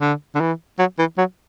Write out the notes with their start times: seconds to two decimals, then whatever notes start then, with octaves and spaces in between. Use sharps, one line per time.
0.01 D3
0.35 D3
0.40 E3
0.79 F#3
0.99 E3
1.18 F#3